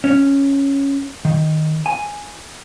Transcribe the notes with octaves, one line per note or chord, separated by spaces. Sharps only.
C#4
D#3
G#5